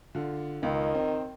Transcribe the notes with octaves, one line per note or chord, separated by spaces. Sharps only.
D3 F4
C#2 D#3
C4